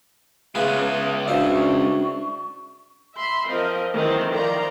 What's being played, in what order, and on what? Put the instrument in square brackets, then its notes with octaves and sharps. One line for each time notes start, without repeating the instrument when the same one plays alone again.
[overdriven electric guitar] C#3 G#3 [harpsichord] B3 F4 B4 [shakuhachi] E5
[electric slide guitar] D4 F#4 D5 [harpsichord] E4 C5 E5 [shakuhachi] F5
[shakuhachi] C#6
[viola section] E5 B5 C6
F3 C4 A#4 D#5
D#3 E3 F#3 G#3 C4
D#3 F3 D5 A#5 C6